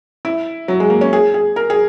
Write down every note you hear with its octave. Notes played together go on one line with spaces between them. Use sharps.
E4
F#3
G#3
A#3
C#4
G#4
G#4
A#4
G#4